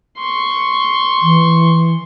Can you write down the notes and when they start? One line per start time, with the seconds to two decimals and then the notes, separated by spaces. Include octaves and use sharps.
0.18 C6 C#6
1.22 E3